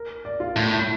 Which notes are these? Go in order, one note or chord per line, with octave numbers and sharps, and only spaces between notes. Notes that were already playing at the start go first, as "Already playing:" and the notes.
Already playing: A#4
D5
F4
A2 E4
E4